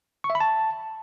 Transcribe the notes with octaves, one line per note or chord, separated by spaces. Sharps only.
C#6
E5
B5
A5